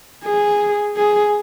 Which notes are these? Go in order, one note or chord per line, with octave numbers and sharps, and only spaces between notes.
G#4
G#4